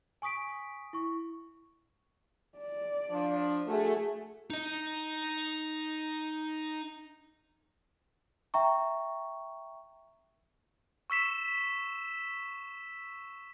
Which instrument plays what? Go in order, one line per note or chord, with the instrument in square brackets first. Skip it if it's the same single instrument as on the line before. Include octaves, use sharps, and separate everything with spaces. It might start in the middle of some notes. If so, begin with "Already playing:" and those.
[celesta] G#5 C#6 D#6 B6 D7
E4 C#6
[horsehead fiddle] D5
[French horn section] F3 D4
[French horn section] A3 [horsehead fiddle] F#4 G#4
[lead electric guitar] D#4 D#5
[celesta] E5 G5 A#5 C#6
[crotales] C#6 E6 B6 E7